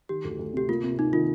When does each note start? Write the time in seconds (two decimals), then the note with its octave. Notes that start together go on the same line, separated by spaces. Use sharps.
0.09 D#3 G4
0.24 D2
0.39 D2
0.54 C3 G4
0.69 A#3 F4
0.83 C3
0.99 C3 D#4
1.13 D#3 F4